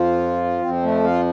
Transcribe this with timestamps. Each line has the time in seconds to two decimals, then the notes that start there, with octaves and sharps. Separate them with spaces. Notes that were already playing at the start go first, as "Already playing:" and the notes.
Already playing: F2 F3 F4
0.62 F2 F3 C4
0.83 A3
1.04 F4